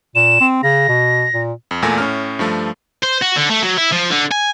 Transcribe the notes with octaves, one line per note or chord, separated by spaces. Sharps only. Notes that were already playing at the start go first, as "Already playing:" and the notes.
A#2 E7
C4
C#3 A#6
B2
A#2
F2
E2 A#2 A3 G#5 A#6
A2 C#4 F6
G2 F3 A3
C5
F#4
D3
A3
F#3
E4
F3
D3
G#5